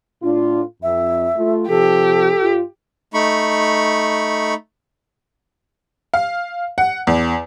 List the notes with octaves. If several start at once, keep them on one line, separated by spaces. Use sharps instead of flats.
A2 D4 F4
F2 E5
A3 F4
C3 F3 G4 A4
G2 F4
A3 D#4 B5 C#6
F5
F#5
E2